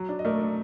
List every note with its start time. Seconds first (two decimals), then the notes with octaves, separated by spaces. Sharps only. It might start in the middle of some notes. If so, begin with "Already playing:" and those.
Already playing: F#3
0.09 D4
0.19 D#5
0.25 A3 A#4 D5
0.41 D4